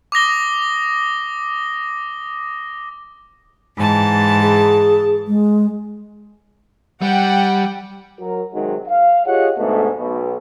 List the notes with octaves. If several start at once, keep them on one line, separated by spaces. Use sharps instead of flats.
D6 D#6 A#6 G7
G#2 E3 A5
G#4
G#3
G3 F#5 G5
F#3 A#4
C3 D#3 F#3 G#3
F5
F4 G4 G#4 C#5 D#5 F#5
G#2 B2 D3 A3
B1 B2